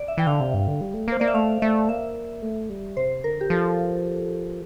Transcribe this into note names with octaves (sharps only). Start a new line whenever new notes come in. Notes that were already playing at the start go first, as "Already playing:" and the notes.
Already playing: D5
E5
E3 G5
D3 F5
C3
G2
D3
G3
A3
A#3 C5
A#3 D5
E5
A3 F5
A3 E5
A#3 E5
A3
G3
C3 C5
D3 A#4
G4
F3 A4